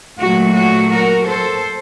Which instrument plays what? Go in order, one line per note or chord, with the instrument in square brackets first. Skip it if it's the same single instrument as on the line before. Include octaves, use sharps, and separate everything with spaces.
[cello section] A#2 F#3 A3 F#4
F#4
F#4 A#4
A4 C5